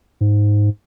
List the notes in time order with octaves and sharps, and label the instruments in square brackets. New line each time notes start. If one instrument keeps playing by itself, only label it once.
[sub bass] G#2